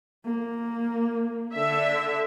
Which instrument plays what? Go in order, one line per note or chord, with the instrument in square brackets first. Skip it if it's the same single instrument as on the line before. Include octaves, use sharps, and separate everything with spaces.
[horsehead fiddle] A#3
[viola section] D3 E5